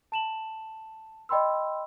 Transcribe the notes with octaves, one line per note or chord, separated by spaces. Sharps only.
A5 E7 F#7
D5 D#5 G5 B5 C6 E6